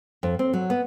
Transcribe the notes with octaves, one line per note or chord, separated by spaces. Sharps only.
F2
C4
F#3
B3